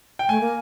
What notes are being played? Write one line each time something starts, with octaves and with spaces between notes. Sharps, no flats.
G5
A3 G#5
A#3